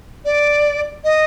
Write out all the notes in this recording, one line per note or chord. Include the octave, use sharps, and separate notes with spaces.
D5
D#5